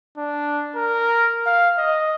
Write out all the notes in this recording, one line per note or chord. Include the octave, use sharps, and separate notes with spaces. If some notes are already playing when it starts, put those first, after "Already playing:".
D4
A#4
F5
D#5